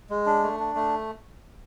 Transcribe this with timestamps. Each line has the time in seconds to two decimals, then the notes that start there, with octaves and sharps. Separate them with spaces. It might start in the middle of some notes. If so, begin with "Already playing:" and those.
0.10 G#3
0.26 D4
0.43 A3
0.60 D4
0.75 A3